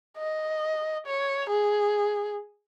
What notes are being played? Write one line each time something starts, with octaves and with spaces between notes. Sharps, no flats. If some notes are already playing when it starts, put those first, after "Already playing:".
D#5
C#5
G#4